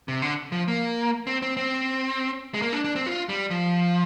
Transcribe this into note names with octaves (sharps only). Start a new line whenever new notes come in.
C3
D3
F3
A#3
C4
C4
C4
G#3
A#3
D4
D4
C4
F4
G3
F3